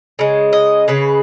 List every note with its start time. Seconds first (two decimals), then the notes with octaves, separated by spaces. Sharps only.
0.19 C#3 G#3
0.53 D#5
0.88 C#3 G#3 B4